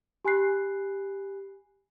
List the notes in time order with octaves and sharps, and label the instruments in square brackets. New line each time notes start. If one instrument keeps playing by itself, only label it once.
[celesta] G4 G#5 B5 F#6 C7